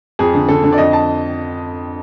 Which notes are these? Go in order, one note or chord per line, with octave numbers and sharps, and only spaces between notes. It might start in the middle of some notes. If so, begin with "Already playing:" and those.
F2 G#4
D3
D3 A4
D3
D5
F2 D#5
A5